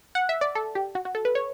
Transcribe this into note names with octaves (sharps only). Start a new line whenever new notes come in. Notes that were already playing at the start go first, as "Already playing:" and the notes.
F#5
E5
D5
A4
G4
F#4
F#4
A4
B4
C#5